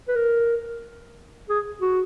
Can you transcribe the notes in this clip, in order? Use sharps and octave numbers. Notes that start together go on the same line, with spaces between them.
B4
A#4
G#4
F#4